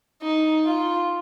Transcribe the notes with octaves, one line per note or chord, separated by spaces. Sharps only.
D#4
F4